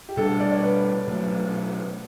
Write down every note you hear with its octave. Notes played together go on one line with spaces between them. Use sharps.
G4
B2 G3 D4 A4
D5
C#5
B4
B2 F#3 A3